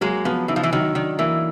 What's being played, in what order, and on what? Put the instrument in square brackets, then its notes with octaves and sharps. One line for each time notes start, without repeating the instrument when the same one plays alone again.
[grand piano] F#3 [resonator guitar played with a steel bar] G#3 A#3
[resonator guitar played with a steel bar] F3 [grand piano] B3
[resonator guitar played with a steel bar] E3 [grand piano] D#4
[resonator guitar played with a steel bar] F3
E3
[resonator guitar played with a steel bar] D#3 [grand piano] F#3
[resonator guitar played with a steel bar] D#3 [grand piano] D4
[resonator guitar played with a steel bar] E3 [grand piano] A#3